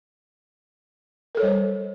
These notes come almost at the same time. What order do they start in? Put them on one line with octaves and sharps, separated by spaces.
A#4 A4 C#5 G3 C5